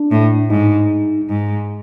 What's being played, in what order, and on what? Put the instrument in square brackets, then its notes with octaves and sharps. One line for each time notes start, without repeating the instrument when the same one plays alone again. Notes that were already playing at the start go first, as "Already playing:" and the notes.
Already playing: [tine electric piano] D4
[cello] A2
[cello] G#2 [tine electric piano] D#4
[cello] G#2